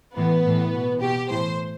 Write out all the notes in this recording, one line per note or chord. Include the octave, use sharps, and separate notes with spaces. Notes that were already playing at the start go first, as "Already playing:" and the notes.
A2 E3 B3
A2 E3
B2
B2 G4
A2 E3 C5